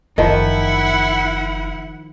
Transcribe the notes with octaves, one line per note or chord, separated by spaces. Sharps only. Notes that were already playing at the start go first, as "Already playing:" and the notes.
F#1 D#3 F3 E4 F#5